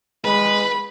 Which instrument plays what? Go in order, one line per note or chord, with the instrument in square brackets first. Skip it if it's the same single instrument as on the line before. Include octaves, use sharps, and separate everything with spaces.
[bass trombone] G#3 [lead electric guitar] B4 [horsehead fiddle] B5